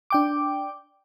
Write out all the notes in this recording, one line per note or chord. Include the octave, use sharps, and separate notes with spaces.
D4 G5 D6